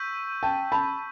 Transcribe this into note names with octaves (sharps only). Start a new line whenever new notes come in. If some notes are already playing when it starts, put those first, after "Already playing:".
Already playing: C#6 E6 G6 B6 D#7
G5 A5
A5 B5